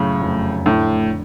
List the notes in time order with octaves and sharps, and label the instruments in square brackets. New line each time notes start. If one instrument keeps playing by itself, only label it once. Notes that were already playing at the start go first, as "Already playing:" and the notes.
Already playing: [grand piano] F#2 C#3 [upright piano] A2
[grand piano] F1
[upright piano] A2 [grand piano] D3